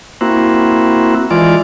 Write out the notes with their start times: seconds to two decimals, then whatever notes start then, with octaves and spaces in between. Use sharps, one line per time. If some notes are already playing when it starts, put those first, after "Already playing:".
0.21 A#3 C4 E4 F#4
1.31 E3 G#3 F4 D5